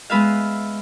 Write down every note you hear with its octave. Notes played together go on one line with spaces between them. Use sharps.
G#3 B3 B4 E5 F5